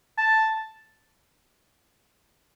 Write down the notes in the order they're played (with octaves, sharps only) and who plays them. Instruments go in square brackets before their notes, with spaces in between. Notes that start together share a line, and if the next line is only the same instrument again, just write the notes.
[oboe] A5